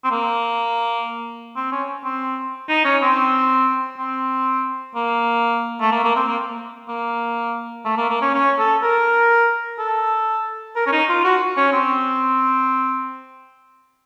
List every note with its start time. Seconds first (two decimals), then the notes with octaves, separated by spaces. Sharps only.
0.04 C4
0.11 A#3
1.56 C4
1.72 C#4
2.04 C4
2.69 D#4
2.85 C#4
3.02 C4
3.98 C4
4.95 A#3
5.81 A3
5.92 A#3
6.04 A#3
6.16 C4
6.28 A#3
6.89 A#3
7.85 A3
7.97 A#3
8.10 A#3
8.22 C#4
8.34 C#4
8.59 A4
8.83 A#4
9.79 A4
10.76 A#4
10.87 C#4
10.92 D#4
11.09 F4
11.24 F#4
11.57 C#4
11.73 C4